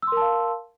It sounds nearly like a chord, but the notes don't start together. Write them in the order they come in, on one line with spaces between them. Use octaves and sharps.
E6 C6 A#4 A5 F5